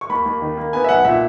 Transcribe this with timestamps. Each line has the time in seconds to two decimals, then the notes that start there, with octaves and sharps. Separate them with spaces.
0.01 C#6
0.09 D#2 B5
0.26 D#2
0.42 D#3
0.57 A#3
0.73 B3 G#5
0.84 E5
0.89 B1 F#5
1.05 A#2 E5